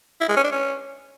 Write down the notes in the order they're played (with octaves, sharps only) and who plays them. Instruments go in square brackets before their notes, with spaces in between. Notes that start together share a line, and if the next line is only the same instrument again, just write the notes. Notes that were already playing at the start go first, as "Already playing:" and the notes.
[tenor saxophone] E4
G#3
C#4
D4
C#4